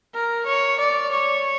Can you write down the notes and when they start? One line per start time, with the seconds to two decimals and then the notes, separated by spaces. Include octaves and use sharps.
0.14 A#4
0.46 C#5
0.79 D5
1.11 C#5